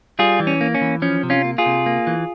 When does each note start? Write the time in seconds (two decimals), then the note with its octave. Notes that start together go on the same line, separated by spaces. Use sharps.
0.19 G3 F4 G#4
0.40 E3
0.47 C#4
0.61 A#3
0.75 C#4
0.82 E3
1.02 F3 C#4
1.23 C3
1.30 C#4 F4
1.45 A#3
1.58 F4 G#4
1.66 C3
1.86 A#3
2.07 E3